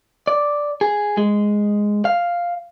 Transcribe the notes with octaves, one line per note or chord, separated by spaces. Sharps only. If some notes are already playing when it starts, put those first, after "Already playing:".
D5
G#4
G#3
F5